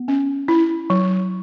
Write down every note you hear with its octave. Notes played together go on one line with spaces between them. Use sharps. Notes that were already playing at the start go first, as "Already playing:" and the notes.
Already playing: B3
C#4
E4
F#3